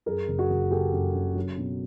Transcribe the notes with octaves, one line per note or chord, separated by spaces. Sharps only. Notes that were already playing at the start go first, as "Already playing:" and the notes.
F#2 G#4 A#4
F#1
F#4 G#4
F#1
F#1 G4 A4
F#2
C#3
F#3
B2